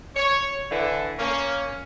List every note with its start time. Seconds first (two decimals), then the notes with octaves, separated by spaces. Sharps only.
0.16 C#5
0.71 D3 E3 D4 E4
1.18 A#3 C#4